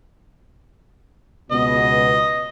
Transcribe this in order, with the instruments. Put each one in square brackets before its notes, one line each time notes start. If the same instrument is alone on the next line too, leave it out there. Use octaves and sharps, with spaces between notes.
[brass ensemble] C#2 B2 B3 [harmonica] D#5